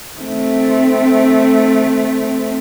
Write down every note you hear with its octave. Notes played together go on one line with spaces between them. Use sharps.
A3 C4